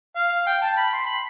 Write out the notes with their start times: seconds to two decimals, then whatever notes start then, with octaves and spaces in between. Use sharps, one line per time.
0.16 F5
0.47 G5
0.62 A5
0.77 B5
0.93 C6
1.06 B5